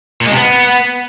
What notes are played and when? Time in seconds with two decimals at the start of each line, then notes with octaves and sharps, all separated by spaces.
0.21 A#2
0.26 G#3
0.31 C3
0.36 B3